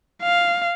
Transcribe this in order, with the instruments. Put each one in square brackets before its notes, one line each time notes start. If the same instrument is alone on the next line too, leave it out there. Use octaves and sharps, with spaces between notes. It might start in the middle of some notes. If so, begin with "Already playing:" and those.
[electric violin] F5